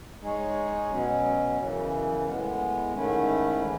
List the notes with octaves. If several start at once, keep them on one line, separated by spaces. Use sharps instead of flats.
G#3 D#4 G#4 C#5
B2 F#3 C#4
F#2 C#3 E3
A2 G#3 B3
G#2 D#3 A3 C#4 E4
E3 G#3